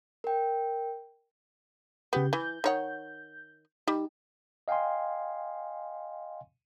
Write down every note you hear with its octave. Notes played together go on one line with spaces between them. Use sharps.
A#4 G5
C#3 B3 G4 G6
E3 G6
D#3 C#5 F#5
G3 D#4
D#5 F5 G5 G#5 C6